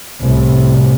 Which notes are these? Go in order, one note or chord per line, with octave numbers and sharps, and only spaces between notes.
C2 A2